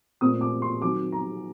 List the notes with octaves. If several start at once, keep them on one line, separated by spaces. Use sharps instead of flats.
A#2 A3 C4 D#6
D6
C6
D#3 F#3 C4 D6
A#5